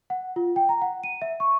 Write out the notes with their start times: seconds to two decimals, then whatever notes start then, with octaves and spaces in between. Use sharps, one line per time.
0.10 F#5
0.36 F4
0.56 G5
0.69 A#5
0.82 F#5
1.04 D#7
1.22 E5
1.40 C#6